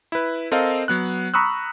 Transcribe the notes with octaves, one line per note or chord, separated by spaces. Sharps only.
E4 B4
C4 A4 A#4 D#5 F5
F#3 B3 F#6
A#5 B5 C#6 D#6 E6 F#6